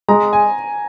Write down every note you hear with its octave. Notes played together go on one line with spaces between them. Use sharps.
G#3 A#5
G#5